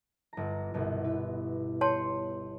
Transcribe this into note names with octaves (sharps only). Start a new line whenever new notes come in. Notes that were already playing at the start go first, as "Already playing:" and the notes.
G1 A#5
G1 C2 B2
E4 B4
C#5 A5 C6 C7 C#7